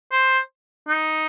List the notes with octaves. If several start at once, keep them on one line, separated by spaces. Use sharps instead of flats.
C5
D#4